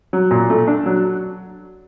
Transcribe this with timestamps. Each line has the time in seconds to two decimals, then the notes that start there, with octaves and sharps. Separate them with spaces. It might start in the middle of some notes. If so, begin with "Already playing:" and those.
0.13 F#3
0.31 A#2
0.50 A3
0.67 D4
0.86 F#3